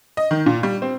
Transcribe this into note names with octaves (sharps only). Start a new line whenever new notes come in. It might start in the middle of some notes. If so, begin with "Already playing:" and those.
D#5
D#3
A#2
G3
C4